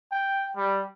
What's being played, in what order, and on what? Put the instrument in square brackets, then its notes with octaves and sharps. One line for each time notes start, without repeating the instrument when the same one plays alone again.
[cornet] G5
G3